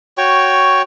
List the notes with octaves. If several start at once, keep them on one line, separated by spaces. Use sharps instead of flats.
F#4 C#5 G5 C#6